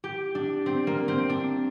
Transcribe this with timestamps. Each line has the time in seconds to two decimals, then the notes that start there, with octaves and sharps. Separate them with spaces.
0.04 G4
0.35 D4
0.66 C4
0.87 A#3
1.08 C4
1.29 D4